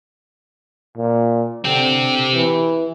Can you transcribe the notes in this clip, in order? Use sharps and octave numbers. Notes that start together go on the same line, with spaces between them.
A#2
D3 C4 G4
E3